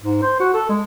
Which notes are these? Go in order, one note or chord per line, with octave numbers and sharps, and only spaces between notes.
G#2
C5
F#4
A4
G#3